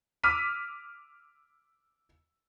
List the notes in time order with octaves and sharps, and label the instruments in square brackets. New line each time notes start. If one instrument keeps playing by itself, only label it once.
[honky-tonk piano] D6 E6 F6 B6 D#7